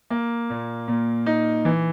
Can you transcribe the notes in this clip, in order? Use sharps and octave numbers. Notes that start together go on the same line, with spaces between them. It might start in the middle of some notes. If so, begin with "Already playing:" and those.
A#3
A#2
A#2
D#4
E3